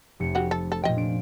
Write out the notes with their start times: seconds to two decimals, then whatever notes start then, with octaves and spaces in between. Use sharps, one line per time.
0.20 F1 A3 C#7
0.35 C#3 F#4 G4
0.51 A4
0.72 A4
0.84 A#2 F3 D#5 G5
0.97 D4 D7